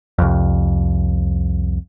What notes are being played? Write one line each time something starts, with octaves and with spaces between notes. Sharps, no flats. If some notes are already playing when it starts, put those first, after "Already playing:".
C2 F2